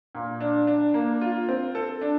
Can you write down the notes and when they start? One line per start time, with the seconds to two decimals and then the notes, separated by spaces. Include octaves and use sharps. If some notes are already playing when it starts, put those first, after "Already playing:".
0.15 A#2
0.41 D4
0.67 D4
0.94 A#3
1.21 F4
1.49 C4
1.75 A4
2.01 D4